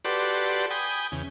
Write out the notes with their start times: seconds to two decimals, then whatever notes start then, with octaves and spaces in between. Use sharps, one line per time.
0.05 F#4 G4 A4 B4 D5 C6
0.71 G5 G#5 B5 D#6
1.12 E2 C#3